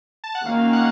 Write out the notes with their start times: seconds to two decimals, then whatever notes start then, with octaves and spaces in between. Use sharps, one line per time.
0.24 A5
0.35 F#5
0.46 D#3 A#3 C#4 F#4 F5
0.73 F#5